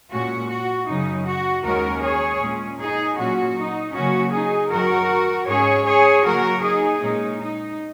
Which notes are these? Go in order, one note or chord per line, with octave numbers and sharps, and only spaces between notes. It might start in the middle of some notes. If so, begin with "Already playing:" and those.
A#2 G#3 C#4 F#4
F#4
F#2 C#3 F#3 D#4
F#4
D#2 D#3 G#3 C#4 F#4 A#4
G#4 C#5
A#2 G#3 C#4
D#4 G#4
A#2 F#3 C#4 F#4
D#4
C#3 F#3 A#3 C#4 F#4
D#4 G#4
F#2 D#3 F#3 F#4 A#4
G#2 G#3 C#4 G#4 C#5
G#4 C#5
C#3 F#3 A#3 F#4 A#4
D#4 G#4
A#2 G#3 C#4 D#4
D#4